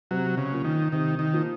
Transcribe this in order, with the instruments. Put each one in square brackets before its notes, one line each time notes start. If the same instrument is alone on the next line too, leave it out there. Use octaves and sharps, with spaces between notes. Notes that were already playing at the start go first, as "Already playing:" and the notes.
[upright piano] C3 [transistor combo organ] F#3
[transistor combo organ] C#3
[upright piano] F3 A#3
[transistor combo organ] D#3
[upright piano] C3 [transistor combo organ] D#3
[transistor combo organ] D#3
[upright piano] F3 A#3